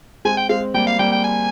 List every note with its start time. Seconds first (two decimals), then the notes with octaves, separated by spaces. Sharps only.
0.25 G#3 C4 G#5
0.37 G5
0.49 G#3 C4 F5
0.74 G3 A#3 G5
0.87 F5
0.99 G3 A#3 G5
1.12 G5
1.24 G#5